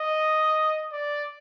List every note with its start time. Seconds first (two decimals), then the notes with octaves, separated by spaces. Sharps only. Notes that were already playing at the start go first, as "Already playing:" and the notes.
Already playing: D#5
0.93 D5